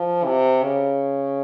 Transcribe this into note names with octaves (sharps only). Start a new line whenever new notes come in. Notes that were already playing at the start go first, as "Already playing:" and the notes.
Already playing: F3
C3
C#3